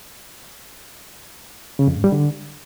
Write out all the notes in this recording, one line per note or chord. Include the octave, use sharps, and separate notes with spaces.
C#3
F2
G#2
G3
D3